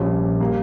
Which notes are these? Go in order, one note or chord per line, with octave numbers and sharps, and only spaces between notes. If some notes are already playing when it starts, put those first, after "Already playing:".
Already playing: A#1 A#2 G3 C#4
G3 A#3